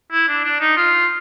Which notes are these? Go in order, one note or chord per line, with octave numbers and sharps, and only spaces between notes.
E4
D4
D4
D#4
F4